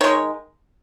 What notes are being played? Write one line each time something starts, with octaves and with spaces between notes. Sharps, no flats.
D#3 G#3 C#5